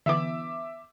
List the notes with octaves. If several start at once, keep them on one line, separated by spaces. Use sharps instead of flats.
D3 E3 B3 E5 D6